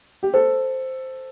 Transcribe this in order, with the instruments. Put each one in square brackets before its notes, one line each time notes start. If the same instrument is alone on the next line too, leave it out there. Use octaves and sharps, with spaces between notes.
[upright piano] G4
[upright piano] A4 [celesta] C5